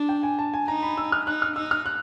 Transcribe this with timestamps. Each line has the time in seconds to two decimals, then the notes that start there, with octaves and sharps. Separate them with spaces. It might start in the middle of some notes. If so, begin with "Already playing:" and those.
Already playing: D4
0.09 G5
0.23 G#5
0.39 A5
0.54 G#5
0.68 D#4 A#5
0.83 B5
0.97 E6
1.12 F6
1.27 D#4 F#6
1.42 F6
1.56 D#4 E6
1.71 F6
1.86 F#6